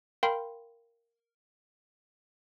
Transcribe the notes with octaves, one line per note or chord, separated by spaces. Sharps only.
A#4 F5 G5 B5 C6